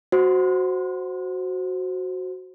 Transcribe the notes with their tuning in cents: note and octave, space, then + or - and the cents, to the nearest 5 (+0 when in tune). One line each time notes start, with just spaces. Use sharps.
F#4 +0 C5 +0